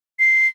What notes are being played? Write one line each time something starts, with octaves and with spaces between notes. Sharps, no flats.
C7